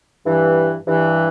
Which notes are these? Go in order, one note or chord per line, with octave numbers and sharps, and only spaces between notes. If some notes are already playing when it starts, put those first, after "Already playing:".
G2 E3
G2 E3